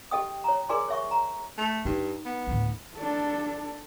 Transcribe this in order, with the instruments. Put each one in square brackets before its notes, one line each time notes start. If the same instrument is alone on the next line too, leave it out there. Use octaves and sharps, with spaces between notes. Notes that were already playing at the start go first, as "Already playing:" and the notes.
[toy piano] G4 A4 D#5 G5 D#6
C#5 A#5
G#4 A#4 D5 G#5 C6
C#5 E5 C#6
A#5
[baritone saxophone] A3
[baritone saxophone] G2 [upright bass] D#4
[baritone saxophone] B3
[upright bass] D2 A2
[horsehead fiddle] D4 A4